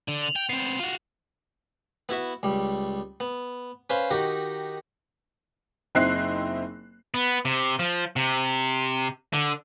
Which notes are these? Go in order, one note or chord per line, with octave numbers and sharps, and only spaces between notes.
D3
F7 F#7
G5
B3 C4 C7
F4 F#4
B3 E4 F#4 E5
C#2 G3
B3
C#4 B4 C5 F5 C6
D#3 D#4 F#4 G4
F#1 C4 D#4 E4 F#6 C7
B3
C3
F3
C3
D3